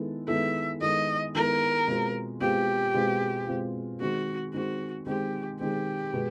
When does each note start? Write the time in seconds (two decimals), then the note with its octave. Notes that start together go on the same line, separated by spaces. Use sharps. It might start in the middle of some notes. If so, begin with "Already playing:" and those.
Already playing: D#3 G#3 B3 E4 A4
0.28 D#3 G#3 B3 E4 A4 E5
0.81 D#3 G#3 B3 E4 A4 D#5
1.34 D#3 G#3 B3 E4 A4 A#4
1.87 B2 G#3 C4 F4
2.41 B2 G#3 C4 F4 G4
2.94 B2 G#3 C4 F4
3.47 B2 G#3 C4 F4
4.01 D#3 G#3 C4 F#4
4.54 D#3 G#3 C4 F#4
5.07 D#3 G#3 C4 G4
5.59 D#3 G#3 C4 G4
6.13 B2 G#3 B3